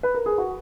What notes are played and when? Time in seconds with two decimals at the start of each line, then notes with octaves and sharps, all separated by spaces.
0.03 B4
0.14 A#4
0.26 G#4
0.38 F#4